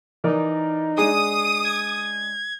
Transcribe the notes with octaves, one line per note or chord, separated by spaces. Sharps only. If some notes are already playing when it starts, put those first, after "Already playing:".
E3 D#4 A#4 D5
G#3 D4 G#4 D#6
G#6